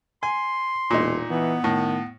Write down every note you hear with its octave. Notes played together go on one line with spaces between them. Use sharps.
G#5 C6
E1 A#2 D#4
E3 B3
A2 D#3